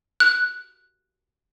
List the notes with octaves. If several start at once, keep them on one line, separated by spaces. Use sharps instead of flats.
F#6